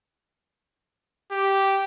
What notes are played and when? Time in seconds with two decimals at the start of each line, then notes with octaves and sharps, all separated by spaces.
1.31 G4